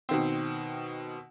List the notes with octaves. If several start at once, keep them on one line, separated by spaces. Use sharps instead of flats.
B2 D#3 C4